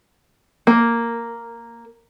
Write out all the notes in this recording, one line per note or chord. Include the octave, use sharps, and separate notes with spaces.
A#3